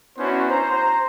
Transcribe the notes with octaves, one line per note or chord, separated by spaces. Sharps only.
B3 C#4 D4 E4 F#4 C5
C5 A#5